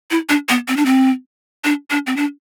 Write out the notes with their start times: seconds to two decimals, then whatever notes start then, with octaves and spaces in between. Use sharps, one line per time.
0.11 E4
0.29 D4
0.49 B3
0.68 C4
0.77 D4
0.86 C4
1.65 D4
1.90 D4
2.07 C4
2.17 D4